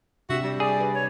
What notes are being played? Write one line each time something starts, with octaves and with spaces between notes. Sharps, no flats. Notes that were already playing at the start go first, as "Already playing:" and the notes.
C3 D4 F#4 G4 E5
G3
G#4 D5
B4
C#5